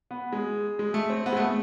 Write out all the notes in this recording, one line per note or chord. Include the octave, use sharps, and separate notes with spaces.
B3
G#3
G#3
A3
C4
B3
G#3
A3